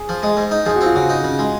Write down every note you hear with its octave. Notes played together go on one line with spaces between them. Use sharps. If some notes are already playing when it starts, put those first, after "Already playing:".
Already playing: G#4
F3
G#3
G#2
D#4
F3 G#4
F#4
C4 F4
C#3 F#4
D#4
C#3
G#3